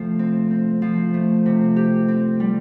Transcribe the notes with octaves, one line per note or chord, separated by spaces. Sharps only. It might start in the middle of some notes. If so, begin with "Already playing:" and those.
Already playing: C3 F3 A3
C4
C4
F3
A3
C3
G4
C4
G3